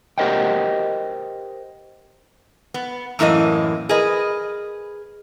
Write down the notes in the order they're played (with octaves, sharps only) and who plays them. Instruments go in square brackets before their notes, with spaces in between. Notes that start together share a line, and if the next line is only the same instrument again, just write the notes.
[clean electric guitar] G4 A#4 C5 D#5 F#5 G5
[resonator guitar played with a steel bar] B3
F#2 A2 E3 A#3 D#5
G#4 A#4 B4 D#5